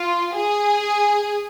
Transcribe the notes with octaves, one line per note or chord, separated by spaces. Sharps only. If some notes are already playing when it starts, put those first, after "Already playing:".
Already playing: F4
G#4